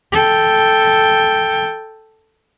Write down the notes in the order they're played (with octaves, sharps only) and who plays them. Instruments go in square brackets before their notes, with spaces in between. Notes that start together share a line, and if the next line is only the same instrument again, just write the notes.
[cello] A4 G5